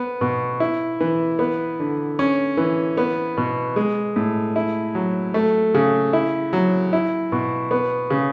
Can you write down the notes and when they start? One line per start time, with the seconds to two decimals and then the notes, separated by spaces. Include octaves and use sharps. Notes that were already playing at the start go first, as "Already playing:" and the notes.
Already playing: B3
0.21 B2
0.60 E4
1.00 E3
1.39 B3
1.79 D3
2.19 C#4
2.57 E3
2.97 B3
3.37 B2
3.76 G#3
4.16 A2
4.56 E4
4.95 F#3
5.34 A3
5.75 C#3
6.13 E4
6.53 F#3
6.93 E4
7.32 B2
7.71 B3
8.10 C#3